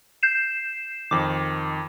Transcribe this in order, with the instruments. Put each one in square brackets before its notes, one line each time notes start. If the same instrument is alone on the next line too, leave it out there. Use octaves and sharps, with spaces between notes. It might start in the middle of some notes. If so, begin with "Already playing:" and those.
[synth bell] G6 C7 E7
[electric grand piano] F2 D#3 [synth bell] D6